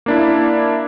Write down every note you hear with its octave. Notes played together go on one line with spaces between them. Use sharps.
A#3 D4 E4